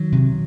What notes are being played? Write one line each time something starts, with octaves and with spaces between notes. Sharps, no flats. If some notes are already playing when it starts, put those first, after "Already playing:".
Already playing: D#3 F#3
C3